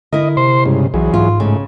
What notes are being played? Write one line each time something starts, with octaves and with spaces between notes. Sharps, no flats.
D3 E4 A#4 D#5
C3 C5 C6
G2 C#3 G#3
B1 E3 F#3 G#4
G#2 F4
A2 C#3 G#3